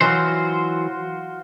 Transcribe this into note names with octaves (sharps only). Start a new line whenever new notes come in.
E3 F#3 F4 F#4 C5